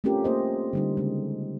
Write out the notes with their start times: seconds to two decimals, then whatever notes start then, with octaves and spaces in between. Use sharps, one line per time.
0.04 A3 C4 C#4 F4 G4 A#4
0.24 A#3 C5 D#5
0.73 D3 G3 D#4
0.97 C#3 G#3